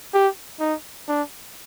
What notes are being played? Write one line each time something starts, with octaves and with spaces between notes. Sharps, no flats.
G4
D#4
D4